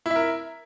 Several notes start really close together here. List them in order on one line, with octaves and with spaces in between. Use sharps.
E4 E5 A#4